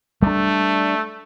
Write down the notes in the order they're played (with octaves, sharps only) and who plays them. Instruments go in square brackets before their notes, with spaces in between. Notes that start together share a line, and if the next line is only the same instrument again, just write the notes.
[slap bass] G3 D4 [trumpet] A3